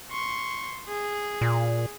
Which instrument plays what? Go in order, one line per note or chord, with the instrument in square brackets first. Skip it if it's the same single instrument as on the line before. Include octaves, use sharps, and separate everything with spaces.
[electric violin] C6 C#6
G#4
[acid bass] A#2